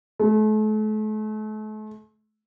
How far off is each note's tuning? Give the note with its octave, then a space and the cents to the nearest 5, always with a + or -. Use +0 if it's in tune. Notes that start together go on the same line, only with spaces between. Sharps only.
A3 -40